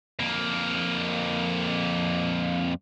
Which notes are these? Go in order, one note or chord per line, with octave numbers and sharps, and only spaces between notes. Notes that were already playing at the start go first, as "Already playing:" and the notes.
F2 A#3